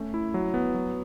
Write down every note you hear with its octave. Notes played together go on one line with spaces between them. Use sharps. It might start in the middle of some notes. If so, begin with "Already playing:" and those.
Already playing: A3 C#4
E4
F#3
B3
F#3